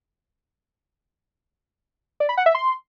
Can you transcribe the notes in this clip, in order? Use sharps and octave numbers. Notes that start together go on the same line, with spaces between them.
D5
B5
F#5
E5
C6